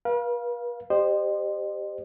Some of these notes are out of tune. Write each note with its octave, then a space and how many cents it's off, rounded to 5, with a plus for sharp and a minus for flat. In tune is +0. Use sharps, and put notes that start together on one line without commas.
B4 -45 F5 +0
G4 +5 C5 +0 D#5 -40